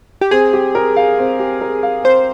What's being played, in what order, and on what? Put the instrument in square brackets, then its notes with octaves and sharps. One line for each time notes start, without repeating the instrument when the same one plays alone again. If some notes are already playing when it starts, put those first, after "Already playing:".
[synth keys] G4
[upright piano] C4 [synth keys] G#4
[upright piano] G4
A#4
F5
C4
G4
A#4
F5
[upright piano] C4 [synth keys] C5